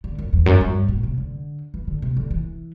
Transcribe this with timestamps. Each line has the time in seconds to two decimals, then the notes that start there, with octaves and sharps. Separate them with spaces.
0.04 D3
0.18 F#2
0.33 E2
0.46 F#2
0.61 G2
0.88 A2
1.03 C3
1.18 D3
1.74 E3
1.87 D3
2.02 C3
2.17 D3
2.31 E3